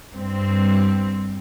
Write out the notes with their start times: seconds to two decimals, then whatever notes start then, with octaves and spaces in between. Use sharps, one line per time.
0.15 G2 G3 C4